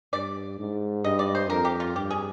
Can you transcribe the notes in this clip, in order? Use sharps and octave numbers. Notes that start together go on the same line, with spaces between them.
G2 D5
G#2
G2 D#5
D5
C5
F2 A#4
G4
F4
G2 G4
G#4